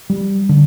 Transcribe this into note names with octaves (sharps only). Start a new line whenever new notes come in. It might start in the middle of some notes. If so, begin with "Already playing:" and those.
G3
D3